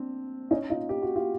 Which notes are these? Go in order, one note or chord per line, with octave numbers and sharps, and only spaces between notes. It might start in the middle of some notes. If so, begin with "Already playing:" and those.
Already playing: C4 D4
C#4 D#4
D#4 F4
G4
F#4
F4 G4